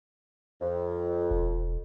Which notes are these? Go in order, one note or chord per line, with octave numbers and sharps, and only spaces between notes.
F2
E1